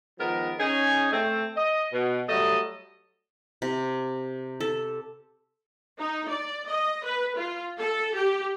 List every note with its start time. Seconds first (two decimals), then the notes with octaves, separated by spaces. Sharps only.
0.19 D#3 F3 G#3 B3 A#4
0.59 C#4 D#4 G#4
1.12 A3 C4
1.56 D#5
1.92 B2
2.28 F#3 G3 A3 A4 D#5
3.62 C3
4.60 A4
5.98 D#4
6.29 D5
6.68 D#5
7.04 B4
7.37 F4
7.79 A4
8.14 G4